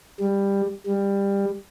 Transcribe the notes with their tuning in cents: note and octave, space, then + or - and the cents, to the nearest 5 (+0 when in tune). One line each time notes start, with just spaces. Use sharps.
G3 +15
G3 +20